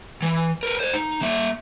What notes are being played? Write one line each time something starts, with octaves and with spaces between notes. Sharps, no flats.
E3
A#4 B4
A4 C5
D#4
A#3 E5